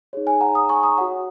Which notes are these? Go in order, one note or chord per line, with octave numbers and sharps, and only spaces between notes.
D#4 G#4 C#5
G#5
F#5 A#5
A#5 D#6
G#5 C#6
A#5 D#6
F#4 C#5 F#5